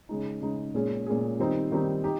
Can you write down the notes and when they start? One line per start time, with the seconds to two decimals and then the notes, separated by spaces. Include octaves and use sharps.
0.09 C#3 G#3 D#4
0.42 C#3 G#3 D#4
0.74 A#2 G#3 C#4 G#4
1.06 A#2 G#3 C#4 G#4
1.39 D#3 G3 C4 D#4
1.72 D#3 G3 C4 D#4
2.04 D#4 G4